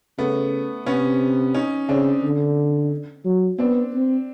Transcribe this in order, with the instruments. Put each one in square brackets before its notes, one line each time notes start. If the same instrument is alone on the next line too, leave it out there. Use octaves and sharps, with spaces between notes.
[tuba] C#3 [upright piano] A3 B3
[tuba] C3 [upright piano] B3 C#4
[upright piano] C#4 D#4
[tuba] C#3 [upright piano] C4 D4
[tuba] D3
F#3
[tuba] B3 [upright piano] C4 D4
[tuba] C4